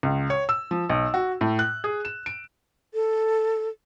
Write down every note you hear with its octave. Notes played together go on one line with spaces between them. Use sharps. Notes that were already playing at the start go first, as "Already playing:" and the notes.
C#2
C#5
E6
F3
B1
F#4
A2
F#6
G#4
E7
D7
A4